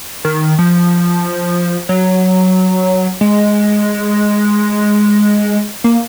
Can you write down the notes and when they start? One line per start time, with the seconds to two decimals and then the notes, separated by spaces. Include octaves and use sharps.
0.25 D#3
0.59 F3
1.89 F#3
3.21 G#3
5.84 A#3